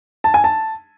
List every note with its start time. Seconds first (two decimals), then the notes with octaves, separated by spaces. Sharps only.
0.24 A5
0.34 G#5
0.44 A5